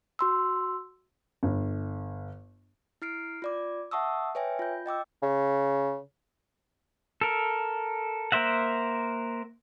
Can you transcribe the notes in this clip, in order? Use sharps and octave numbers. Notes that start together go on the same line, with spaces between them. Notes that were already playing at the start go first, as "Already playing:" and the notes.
F#4 C6 E6
G1
E4 F6 C7 D7
F4 D5 D6
E5 F#5 A5 C#6 D#6 E6
B4 C#5 E5 G5 G#5
F4 G6
D#5 G5 D6 E6
C#3
A4 A#4
A#3 A#4 C5 E5 F#5